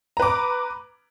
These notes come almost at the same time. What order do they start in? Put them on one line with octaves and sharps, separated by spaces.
A#5 B4 D6